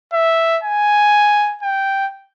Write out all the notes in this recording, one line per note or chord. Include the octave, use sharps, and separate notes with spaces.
E5
G#5
G5